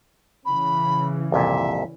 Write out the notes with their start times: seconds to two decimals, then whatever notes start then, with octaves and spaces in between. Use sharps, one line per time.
0.45 C#3 E3 B5
1.32 C2 F2 A#2 E5